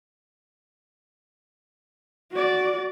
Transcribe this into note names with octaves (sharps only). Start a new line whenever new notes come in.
F#4 D5